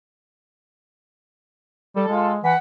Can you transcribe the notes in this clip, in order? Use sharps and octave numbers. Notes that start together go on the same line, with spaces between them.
G3 A4
G#3 F4
E3 F#5 B6